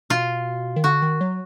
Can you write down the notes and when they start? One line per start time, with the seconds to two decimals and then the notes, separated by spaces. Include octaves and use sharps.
0.10 B2 F4
0.76 D#3
0.84 D3 F#4
1.02 D#3
1.21 F#3